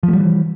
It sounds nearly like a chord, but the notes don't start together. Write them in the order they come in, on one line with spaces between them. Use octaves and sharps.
F3 A3 G3 E3